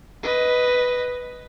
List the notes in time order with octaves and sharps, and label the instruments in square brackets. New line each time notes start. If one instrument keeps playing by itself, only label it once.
[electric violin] B4 D#5